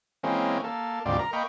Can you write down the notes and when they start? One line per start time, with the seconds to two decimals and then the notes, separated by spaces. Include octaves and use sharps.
0.23 E3 G#3 A#3 C4 C#4
0.64 A#3 A4
1.06 D2 G#2 C3 G3 F4 D5
1.19 A#4 A#5
1.33 A#3 D#5 G5 B5 C#6